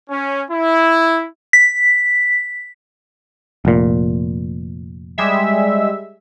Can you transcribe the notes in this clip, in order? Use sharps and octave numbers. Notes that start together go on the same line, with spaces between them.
C#4
E4
B6
F1 A#2
G3 G#3 E5